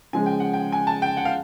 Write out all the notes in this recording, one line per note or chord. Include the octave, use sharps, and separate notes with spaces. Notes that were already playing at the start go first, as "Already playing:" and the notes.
C#3 F3 G#3 G#5
G5
F#5
G5
G#5
A5
G5
F#5
F5